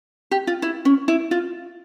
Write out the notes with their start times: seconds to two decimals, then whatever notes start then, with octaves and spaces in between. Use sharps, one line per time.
0.31 G4
0.47 F4
0.62 E4
0.85 C#4
1.08 E4
1.31 F4